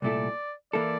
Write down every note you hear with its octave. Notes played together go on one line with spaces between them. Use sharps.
C2 A#2 A3 E4 A4 D5
E3 A#3 E4 A4 D5